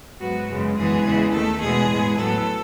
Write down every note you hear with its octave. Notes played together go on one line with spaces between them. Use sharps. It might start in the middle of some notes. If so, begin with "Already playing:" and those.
G#2 F#3 B3 F#4
F#2 C#3 G#3 B3
F#2 E3 G#3 B3 G#4
E2 C#3 E3 G#3 B3
D#2 D#3 A3 A4
E2 B2 G#3 B3 G#4
A2 G#3 B3
A2 F#3 B3 A4